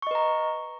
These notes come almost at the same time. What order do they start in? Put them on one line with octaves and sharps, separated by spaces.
C#6 D#5 B4 A#5